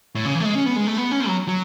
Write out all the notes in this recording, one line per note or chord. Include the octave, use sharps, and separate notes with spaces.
A2
C#3
E3
A3
G#3
C#4
B3
G#3
A3
B3
C#4
F#3
F#3